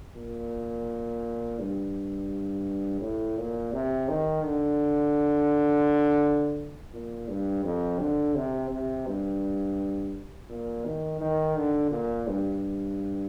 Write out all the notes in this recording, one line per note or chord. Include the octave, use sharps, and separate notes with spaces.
A#2
G2
A2
A#2
C3
D#3
D3
A#2
G2
F2
D3
C3
C3
G2
A#2
D#3
D#3
D3
A#2
G2